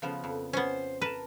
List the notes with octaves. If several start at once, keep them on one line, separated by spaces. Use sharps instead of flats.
C#3 F3 B3
F2
B3 C#4 C5
A#4 B4 A5